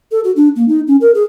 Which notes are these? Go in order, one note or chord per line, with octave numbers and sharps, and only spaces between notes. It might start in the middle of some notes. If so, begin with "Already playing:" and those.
A4
F#4
D4
A#3
D#4
C#4
A#4
G#4